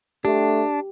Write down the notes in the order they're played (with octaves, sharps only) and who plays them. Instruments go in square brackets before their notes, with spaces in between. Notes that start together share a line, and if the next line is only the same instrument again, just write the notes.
[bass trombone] A3 [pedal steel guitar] D4 [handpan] G4